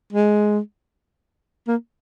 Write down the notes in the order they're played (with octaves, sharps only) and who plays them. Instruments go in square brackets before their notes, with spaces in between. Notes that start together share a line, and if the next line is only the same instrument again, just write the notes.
[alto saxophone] G#3
A#3